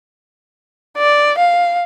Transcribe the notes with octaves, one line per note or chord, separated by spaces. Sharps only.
D5
F5